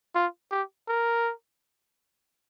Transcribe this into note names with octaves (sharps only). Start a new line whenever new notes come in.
F4
G4
A#4